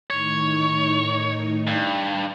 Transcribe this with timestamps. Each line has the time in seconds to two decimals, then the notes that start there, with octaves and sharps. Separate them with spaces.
0.10 A2 D#3 D#4 C#5
1.67 G2